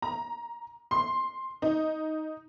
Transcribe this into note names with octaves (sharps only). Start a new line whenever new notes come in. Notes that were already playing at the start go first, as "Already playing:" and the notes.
A#5
C6
D#4